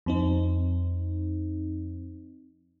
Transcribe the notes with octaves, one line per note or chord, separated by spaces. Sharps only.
F2 C4 D#4